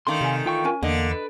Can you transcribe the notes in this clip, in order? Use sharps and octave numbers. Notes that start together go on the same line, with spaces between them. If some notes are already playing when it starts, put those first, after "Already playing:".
D#3 A3 C#4 D4 F5 C6
C3 D5 E5 G#5
E3 F4 G5 C#6
C#4 A#4 G#5
E2 D3 A#3 D#5
B4